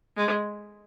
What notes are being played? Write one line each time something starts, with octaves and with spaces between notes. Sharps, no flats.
G#3